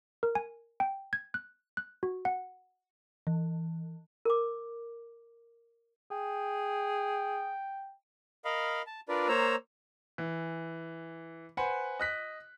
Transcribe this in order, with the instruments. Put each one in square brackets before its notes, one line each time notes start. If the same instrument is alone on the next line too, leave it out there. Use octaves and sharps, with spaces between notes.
[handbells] A#4
G#5
G5
G#6
F#6
F#6
F#4
F#5
[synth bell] E3
[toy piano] A#4 D6
[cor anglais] G#4 [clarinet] G5
[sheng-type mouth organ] A#4 D#5 F5 B5
A5
D4 F4 A#4 B4 D5
A#3 C5 C#5 A#5 E6
[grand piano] E3
B4 C5 F#5 G#5 B5
D#5 F#6 B6